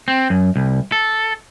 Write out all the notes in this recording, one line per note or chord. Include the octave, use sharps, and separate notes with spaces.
C4
F#2
C2
A4